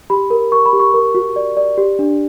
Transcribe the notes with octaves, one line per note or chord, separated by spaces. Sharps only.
G4 B5
A#4
A#4 C#6
B5
G4
C#6
A#4
F#4
D5
D5
G4
D4